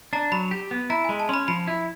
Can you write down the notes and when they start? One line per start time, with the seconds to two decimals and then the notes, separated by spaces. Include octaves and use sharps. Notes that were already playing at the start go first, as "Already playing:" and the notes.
0.13 D4 A#5
0.32 F#3 B5
0.51 G4
0.71 B3
0.90 E4 A#5
1.05 G#3 G#5
1.20 A5
1.29 C#4 C6
1.34 B5
1.48 F3 B5
1.68 E4